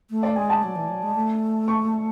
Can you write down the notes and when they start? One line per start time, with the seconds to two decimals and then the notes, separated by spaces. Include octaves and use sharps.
0.10 A3
0.23 D5
0.36 G#3 G#5
0.50 A5
0.63 F#3
0.76 E3
0.89 F#3
1.02 G#3
1.15 A3
1.68 C#6